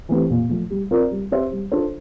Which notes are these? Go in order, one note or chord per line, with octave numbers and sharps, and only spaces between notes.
E3 A3 C4 G4
A#2
F3 A3
G3
C4 F4 A#4 D5
G3
C4 G4 C5 E5
G3
D4 F4 A4 C5